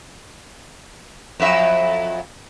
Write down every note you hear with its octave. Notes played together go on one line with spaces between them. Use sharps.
F2 F#3 E5